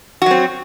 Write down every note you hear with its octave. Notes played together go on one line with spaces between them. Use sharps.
F#3 C4 F#4